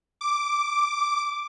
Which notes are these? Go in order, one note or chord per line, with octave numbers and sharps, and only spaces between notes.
D6